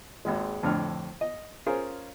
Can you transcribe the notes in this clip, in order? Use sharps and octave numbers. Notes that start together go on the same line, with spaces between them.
G#1 D#2 G#3
F2 A2 D3 F6
D#5
C#4 F4 G#4 A#4 C5 C#5